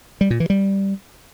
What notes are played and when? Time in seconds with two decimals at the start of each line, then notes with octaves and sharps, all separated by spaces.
0.21 G3
0.30 A#2
0.40 E3
0.50 G3